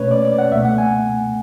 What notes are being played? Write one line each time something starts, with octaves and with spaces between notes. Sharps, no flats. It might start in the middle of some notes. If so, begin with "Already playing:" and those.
Already playing: B2 A3 C#4 B4 C#5
D5
D5
F#5
C#2 B2 A3 E5
F#5
G#5